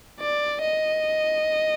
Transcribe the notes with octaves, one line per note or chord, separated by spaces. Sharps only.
D5
D#5